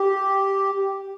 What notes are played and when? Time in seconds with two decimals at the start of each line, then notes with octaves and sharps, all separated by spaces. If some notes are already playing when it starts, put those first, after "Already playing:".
Already playing: G4